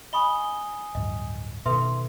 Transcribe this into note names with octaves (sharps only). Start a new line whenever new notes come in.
D#5 G#5 B5 C#6 D#6 G7
D1 G2 D#5
B2 D#3 A4 B4 E5 C6